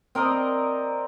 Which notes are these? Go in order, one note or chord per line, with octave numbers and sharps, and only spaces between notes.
C4 A#4 D5 D#5